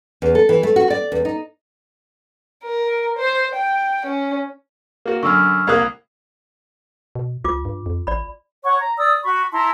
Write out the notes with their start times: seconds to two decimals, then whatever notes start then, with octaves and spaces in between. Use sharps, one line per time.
0.22 E2
0.35 A4
0.49 E3
0.63 A3
0.76 F#4
0.90 D5
1.12 E2
1.25 D#4
2.64 A#4
3.18 C5
3.56 G5
4.06 C#4
5.06 A#3 F#4
5.23 F#2 D3 C#6 E6 F6
5.67 C2 A#3 D#6 F#6 G#6
7.15 B2
7.44 C#2 F4 D6
7.65 G2
7.86 F2
8.07 A1 D5 B5
8.64 C#5 F#5 C#6
8.81 A#5
8.98 D5 D#6 E6
9.24 F#4 B5 C#6
9.52 E4 A5 A#5 C6